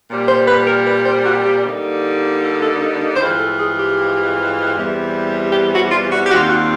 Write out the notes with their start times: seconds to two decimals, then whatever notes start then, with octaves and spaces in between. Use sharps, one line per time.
0.09 A#2 G3 C4
0.29 C5
0.48 B4
0.67 A#4
0.87 B4
1.06 C5
1.25 F#4
1.45 G4
1.64 D3 G3 A#3 D#4
2.42 A4
2.62 A4
2.81 A4
3.15 C5
3.20 G2 E3 G#3 C4 F4 B4
3.39 A4
3.59 G#4
3.78 G4
4.75 E2 C3 E3 G3
5.53 G4
5.72 F#4
5.92 F4
6.11 F#4
6.22 G4
6.30 D#2 D#3 G3 C4 F4 F#4
6.50 F#4